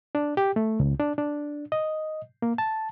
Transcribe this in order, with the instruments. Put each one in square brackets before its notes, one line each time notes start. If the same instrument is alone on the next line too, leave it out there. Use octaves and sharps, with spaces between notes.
[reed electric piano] D4
G4
A3
C#2
D4
D4
D#5
A#3
A5